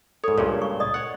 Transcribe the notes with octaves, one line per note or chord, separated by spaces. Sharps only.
G#2 A4 C#5
C#2 G2 A#2 G#4 C#5 F5
C#6
D5 D#5 D#6
C#5 F#5